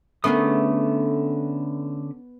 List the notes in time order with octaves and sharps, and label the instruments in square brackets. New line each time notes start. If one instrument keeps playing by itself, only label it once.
[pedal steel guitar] D3 C#4 D#6 [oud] A3 G#4 A#4 [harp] B3